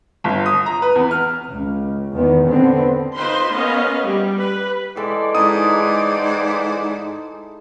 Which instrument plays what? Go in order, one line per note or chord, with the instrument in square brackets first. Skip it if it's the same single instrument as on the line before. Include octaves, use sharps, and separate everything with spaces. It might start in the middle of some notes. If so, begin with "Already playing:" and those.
[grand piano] G1
D#6
A#5
B4
E2
F6
[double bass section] C#2
E2 D#3 B3
D3 B3 C4
[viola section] D#4 F4 B4 C5 C6
A#3 B3 C#4 D#5 F5
G3
B4
[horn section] A2 E3 D5 [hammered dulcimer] G#3 A4 G5
[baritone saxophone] G#2 [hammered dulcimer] D#4 E4 [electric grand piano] D#6